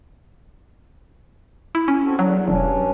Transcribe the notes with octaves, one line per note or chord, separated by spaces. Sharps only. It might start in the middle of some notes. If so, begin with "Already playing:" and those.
E4
C#4
C4 F#4 A4
E2 D3 F#3
E1 G2 C#4 D4